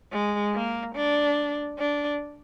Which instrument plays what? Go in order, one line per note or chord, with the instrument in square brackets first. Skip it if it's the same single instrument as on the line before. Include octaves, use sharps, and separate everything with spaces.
[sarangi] G#3
A#3
D4
D4